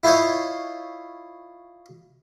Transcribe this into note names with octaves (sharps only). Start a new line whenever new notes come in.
E4 F4 C5 C#5 D#5